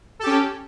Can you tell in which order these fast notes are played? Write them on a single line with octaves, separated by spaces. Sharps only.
A4 G4 C#4